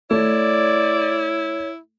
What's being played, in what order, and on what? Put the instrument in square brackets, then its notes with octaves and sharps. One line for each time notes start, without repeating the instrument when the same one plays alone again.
[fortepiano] A3 [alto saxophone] E4 [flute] C#5 [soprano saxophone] D5